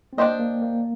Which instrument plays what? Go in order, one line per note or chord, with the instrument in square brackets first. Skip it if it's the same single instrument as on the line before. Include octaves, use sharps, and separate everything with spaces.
[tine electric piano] C4
[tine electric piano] A#3 [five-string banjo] D4 G4 C5 D#5
[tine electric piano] A#3
A#3